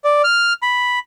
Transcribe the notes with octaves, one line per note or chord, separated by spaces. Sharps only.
D5
F6
B5